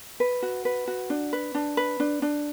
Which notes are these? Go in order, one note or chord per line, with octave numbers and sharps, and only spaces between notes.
B4
F#4
B4
F#4
D4
B4
D4
B4
D4
D4